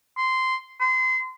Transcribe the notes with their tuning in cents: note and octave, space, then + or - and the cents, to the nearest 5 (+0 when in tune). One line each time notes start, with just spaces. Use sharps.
C6 -10
C6 -30